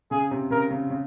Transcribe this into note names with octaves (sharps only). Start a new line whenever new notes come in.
C#3 G#4
C3
C#3 A#4
C#3
C#3